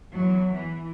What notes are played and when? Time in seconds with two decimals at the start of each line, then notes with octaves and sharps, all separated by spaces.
0.11 E2 F#3
0.53 E3